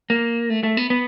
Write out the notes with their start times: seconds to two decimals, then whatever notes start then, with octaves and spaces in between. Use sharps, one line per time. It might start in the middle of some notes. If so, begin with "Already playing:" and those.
0.10 A#3
0.50 A3
0.63 A3
0.77 B3
0.90 B3